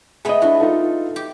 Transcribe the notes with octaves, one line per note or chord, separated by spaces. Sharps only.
A3 B3 G#4 D#5
D4 E4 F#4
D#4 F4 A4
G4